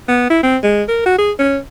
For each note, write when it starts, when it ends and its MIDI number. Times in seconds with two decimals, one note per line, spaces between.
0.08 0.26 59
0.30 0.42 64
0.43 0.57 60
0.63 0.83 56
0.88 1.01 70
1.06 1.17 66
1.18 1.32 68
1.39 1.58 61